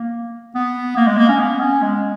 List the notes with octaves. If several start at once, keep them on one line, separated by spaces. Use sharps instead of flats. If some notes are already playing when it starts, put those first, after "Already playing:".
Already playing: A#3
B3
A#3
G#3
A#3
C#4
B3
C#4
G#3